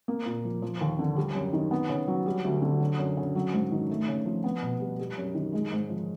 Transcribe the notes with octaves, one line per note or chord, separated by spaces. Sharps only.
A#3
A#2
F3
F3
D#2
D3
G3
F#2
D#3
B3
C#3
F#3
G3
D2
D3
F#3
F#2
C#3
F#3
G#2
D#3
A3
C#3
F3
B3
B2
G3
G3
F#2
D#3
G#3
G#2
F3